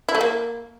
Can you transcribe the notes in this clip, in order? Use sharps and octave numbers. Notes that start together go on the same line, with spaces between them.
E4
A3
A#3